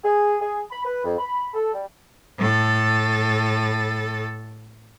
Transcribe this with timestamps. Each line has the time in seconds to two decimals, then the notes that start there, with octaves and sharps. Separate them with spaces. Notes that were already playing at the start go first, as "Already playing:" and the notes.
0.03 G#4
0.40 G#4
0.70 B5
0.84 B4
1.04 F2
1.18 B5
1.53 A4
1.73 G3
2.39 A2 A4